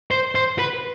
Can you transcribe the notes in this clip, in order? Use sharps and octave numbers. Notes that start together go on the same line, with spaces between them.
C5
C5
B4